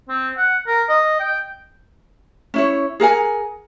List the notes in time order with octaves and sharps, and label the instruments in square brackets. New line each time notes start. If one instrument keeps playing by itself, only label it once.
[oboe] C4
F#5
A#4
D#5
G5
[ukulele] C#4 E4 C#5
G#4 A#4 F#5 G#5